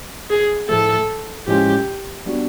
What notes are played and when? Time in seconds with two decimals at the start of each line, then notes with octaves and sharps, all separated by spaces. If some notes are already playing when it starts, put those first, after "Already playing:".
0.30 G#4
0.69 A2 F3 A3 A4
1.47 A2 F3 G#3 C#4 F4 G4
2.26 G3 B3 D4 F#4